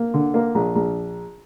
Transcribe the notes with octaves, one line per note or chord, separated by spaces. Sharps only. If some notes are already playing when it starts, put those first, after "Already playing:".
Already playing: A#3
D3
A#3
A#1
A#1